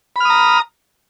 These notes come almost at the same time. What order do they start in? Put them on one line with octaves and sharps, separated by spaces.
B5 F6 D#6 A#5